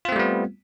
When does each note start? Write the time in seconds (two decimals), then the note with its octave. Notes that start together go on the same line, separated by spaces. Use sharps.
0.05 F4
0.09 C4
0.12 A3
0.16 G3
0.19 B3